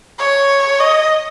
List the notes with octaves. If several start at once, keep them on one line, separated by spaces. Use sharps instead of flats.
C#5
D#5